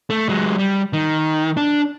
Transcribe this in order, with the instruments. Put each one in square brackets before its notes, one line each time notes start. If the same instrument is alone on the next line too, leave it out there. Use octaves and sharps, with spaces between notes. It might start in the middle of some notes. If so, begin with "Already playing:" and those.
[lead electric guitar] A3
F#3 G#3
G3
D#3
D4